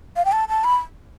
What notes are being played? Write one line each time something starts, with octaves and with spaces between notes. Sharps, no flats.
F5
G5
A5
A5
B5